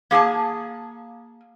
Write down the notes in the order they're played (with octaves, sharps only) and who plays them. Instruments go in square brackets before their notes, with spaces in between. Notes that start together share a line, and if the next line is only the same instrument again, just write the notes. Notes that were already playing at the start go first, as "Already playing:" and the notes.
[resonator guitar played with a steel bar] A#3 G#4 G5 A5